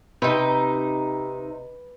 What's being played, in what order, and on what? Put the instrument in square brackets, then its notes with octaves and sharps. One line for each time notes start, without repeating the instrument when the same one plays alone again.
[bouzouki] C3 D#4 [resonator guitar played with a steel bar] B4